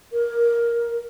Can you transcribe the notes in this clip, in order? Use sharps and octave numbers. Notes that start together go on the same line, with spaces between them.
A#4